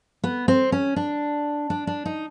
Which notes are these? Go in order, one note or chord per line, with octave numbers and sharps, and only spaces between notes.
B3
C4
C#4
D4
D4
D4
D#4